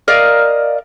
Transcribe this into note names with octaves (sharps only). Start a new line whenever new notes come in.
A#4 D5 D#5 F5